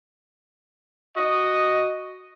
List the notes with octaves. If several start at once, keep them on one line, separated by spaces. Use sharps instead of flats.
F#4 D#5